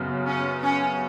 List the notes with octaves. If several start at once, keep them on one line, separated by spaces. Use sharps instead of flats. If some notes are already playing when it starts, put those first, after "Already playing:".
Already playing: F#2 C#3 F#3 B3
C#4
C#4